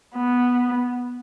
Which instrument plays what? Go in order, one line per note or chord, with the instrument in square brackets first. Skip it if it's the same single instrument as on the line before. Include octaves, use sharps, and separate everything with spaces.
[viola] B3